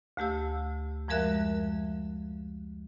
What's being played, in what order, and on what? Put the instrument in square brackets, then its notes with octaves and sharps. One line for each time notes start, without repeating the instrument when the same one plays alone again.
[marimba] D2 A3 G4 E6
F#2 F3 G#3 A#4 E5 F#6